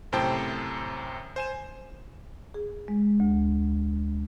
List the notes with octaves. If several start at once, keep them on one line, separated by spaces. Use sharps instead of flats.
F#2 A2 C3 C5 G5 A5
C5 G#5 E7
G#4
G#3
D2